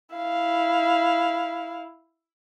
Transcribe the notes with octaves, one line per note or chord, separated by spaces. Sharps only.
E4 F5